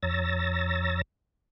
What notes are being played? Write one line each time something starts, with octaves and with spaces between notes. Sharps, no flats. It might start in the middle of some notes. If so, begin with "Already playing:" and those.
F2 C#5 A#5 E6 A6 A#6